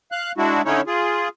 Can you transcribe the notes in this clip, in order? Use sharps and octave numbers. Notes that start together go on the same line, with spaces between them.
F5 F#6
G#3 D4 E4 F#4
D3 C#4 D#4 E4 C#5
F4 G#4